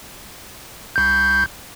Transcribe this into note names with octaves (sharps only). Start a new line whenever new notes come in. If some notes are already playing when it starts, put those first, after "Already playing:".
C2 G6